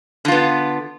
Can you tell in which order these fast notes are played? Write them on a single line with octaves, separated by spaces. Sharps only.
D3 F4 B3